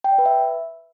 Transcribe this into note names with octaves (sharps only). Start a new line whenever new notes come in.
G5
D5
B4
E5